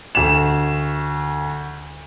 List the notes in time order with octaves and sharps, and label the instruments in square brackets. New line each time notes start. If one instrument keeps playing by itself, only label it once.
[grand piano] D2 E7